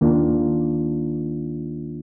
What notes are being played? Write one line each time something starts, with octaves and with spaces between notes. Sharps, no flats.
D#2 D#3 A#3 D4 F4